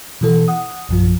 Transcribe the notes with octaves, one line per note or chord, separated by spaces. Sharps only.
B2 E3 A4
F#5 D#6
A#1 F#2 F3